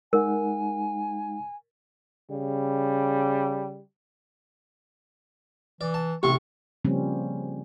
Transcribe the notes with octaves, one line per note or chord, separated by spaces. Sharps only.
G#3 D#4 A#4 F#5 G#5
C#3 G3
E3 D5
A5
A1 C3 C6 C#6
C#3 F3 G3 A#3 C4 C#4